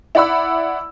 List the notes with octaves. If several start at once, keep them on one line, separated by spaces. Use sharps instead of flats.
E4 D5 F#5 B5 E6